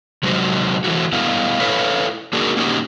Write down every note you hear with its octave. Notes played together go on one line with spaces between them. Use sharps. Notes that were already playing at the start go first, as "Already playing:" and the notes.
C3 F#3 G#3 D#4 F#4 C5
E3 G3 A3 E4 F#4
G2 A3 B3 E4 F5
E4 A4 B4 C#5 E5 F5
A#3 D4 D#4 F#4 G#4 A#4
A#3 C#4 D#4 F#4 G4